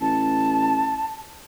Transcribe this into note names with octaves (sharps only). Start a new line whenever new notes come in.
A1 A5